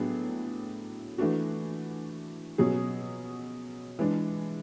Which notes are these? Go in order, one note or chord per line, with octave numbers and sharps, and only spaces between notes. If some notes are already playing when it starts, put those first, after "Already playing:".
Already playing: A2 F#3 B3 D4 G#4
E3 A3 D4 F#4
B2 F#3 C#4 G#4
E3 G#3 D4